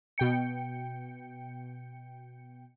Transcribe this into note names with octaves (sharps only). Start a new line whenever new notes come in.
B2 G5 C#7